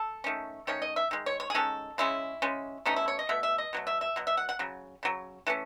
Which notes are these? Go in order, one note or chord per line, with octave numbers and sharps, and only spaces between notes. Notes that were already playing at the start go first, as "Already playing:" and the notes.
Already playing: A4
D#3 A3 C#4
D#3 A3 C#4 C#5
D#5
E5
D#3 G#3
C#5
C#5
G#4
D#3 G#3 C#4 A4
C#3 G#3 C#4 E4
C#3 G#3 C#4
B2 A3 C#4 D#4
E4
C#5
D#5
B2 A3 E5
E5
D#5
B2 F#3 A3
E5
E5
B2 F#3
E5
F#5
F#5
C#3 F#3
C#3 F#3
E3 A3 C#4